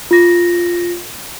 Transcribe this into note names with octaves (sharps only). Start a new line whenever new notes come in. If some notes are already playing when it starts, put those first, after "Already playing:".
F4 A#6